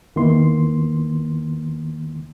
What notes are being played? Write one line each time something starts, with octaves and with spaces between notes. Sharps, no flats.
E2 D#3 A#3 B3 E4 C6